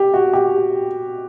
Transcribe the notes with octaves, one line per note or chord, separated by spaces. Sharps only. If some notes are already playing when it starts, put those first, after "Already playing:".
Already playing: G4
F#4
G4